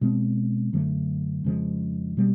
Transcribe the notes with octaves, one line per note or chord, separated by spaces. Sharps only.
B2 G#3 C4
F#2 D3 F#3 A3
F2 C#3 F3 G#3
B2 G3 A#3